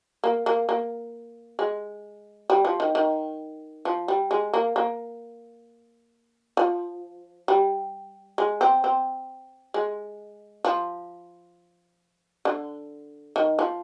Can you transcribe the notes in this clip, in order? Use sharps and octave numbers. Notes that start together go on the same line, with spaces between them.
A#3
A#3
A#3
G#3
G3
F3
D#3
D#3
F3
G3
G#3
A#3
A#3
F3
G3
G#3
C4
C4
G#3
F3
D3
D#3
F3